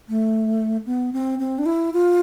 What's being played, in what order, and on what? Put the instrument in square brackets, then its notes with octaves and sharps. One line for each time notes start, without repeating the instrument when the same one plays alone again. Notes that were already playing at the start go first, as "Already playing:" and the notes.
[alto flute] A3
B3
C4
C4
D4
E4
F4